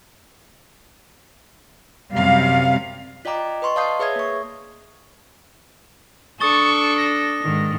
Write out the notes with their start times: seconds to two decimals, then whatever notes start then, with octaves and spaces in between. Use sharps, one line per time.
2.14 F#2 C3 G3 C4 F5
3.25 F4 D5 D#5 G5 A#5 D6
3.62 B4 D#5 C6 C#6
3.76 D5 F5 A5 D#6 G6 C7
3.99 G#4 B4 C#5 E5 D#6 G#6
4.16 A#3 C#6
6.40 D4 A4 C#6 D#6 A6 G7
6.97 A#6
7.42 G#2 D#3